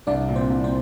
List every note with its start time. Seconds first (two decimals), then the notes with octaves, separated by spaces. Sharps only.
0.07 C2 D4 D5
0.29 A#2
0.35 C4 C5
0.50 C2
0.64 C4 C5